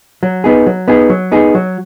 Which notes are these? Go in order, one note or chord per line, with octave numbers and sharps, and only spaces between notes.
F#3
B3 D#4 G#4
F#3
B3 D#4 G#4
F#3
B3 D#4 G#4
F#3